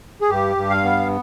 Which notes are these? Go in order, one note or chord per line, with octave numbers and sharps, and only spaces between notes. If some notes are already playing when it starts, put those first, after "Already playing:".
G#4
G2 G4
G2
F5
B3